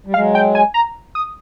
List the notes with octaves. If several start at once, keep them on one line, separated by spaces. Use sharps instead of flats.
G3
F#3 G#3 F5
G5
G#5
A#5
D#6